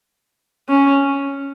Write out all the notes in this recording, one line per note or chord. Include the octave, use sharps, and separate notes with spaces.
C#4